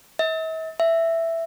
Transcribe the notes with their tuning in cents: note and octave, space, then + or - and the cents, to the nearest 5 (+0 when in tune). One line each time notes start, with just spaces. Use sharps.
E5 -45
E5 +5